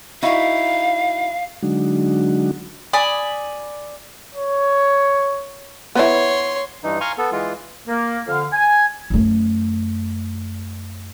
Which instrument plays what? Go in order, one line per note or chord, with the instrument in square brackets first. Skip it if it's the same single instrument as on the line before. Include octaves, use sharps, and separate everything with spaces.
[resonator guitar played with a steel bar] D#4 E4 F#4 [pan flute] F5
[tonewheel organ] D3 F#3 G#3 D4 D#4 F#4
[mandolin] D5 G#5 B5 D#6
[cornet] C#5
[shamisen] B3 E4 [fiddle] C#5 C6
[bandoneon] G2 E3 D#4
F5 G#5 A#5 C6 C#6
B3 A4
E3 G#3 F4
[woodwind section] A#3
F2 D3 F5
G#5
[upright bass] F#2 A3